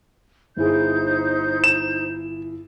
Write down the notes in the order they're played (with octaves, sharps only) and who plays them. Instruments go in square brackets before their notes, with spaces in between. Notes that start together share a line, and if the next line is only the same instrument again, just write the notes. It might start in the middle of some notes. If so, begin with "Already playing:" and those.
[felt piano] G1 E4 G#4 [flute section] D#4 C5 G6
[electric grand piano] E7